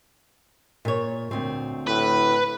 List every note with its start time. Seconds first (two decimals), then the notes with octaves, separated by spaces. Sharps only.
0.85 A#2 C#5
1.31 D2 C4
1.87 A2 B4